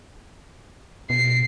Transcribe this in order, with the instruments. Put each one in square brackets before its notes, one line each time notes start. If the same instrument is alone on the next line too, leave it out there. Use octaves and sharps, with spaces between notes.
[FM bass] B2 [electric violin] C7